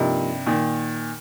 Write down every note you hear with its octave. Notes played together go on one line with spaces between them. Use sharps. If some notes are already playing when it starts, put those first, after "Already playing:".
Already playing: G2 C3 F3 A#3 D#4 G4 D#5
A#2 D#3